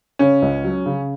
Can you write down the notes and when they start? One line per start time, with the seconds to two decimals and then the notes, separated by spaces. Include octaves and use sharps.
0.19 C#3 C#4
0.42 C#2
0.64 F#3
0.86 C#3